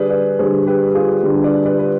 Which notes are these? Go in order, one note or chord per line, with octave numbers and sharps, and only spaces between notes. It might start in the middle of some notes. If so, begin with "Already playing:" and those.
Already playing: D3 G3 G#4 B4 D5
B4 D5
D3 G3 G#4 C5
G4 B4
F4 G#4
D3 G3
B4 D5
B4 D5
B4